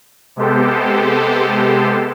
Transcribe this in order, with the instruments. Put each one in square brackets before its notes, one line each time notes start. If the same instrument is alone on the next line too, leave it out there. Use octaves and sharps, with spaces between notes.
[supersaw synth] C3 G#3 B3 G4 A4 C5